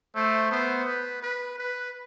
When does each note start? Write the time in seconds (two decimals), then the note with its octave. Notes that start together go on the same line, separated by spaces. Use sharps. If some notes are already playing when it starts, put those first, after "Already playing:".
0.15 A3 C5
0.51 B3 C5
0.87 B4
1.22 B4
1.58 B4